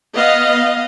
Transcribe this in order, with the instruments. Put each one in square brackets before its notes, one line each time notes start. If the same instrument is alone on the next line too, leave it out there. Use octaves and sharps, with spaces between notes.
[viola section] B3 D#5 F5